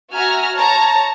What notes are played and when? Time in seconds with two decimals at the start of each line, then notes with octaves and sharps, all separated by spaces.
0.13 F#4 E5 G#5 A#5 F6
0.55 C#5 A5 A#5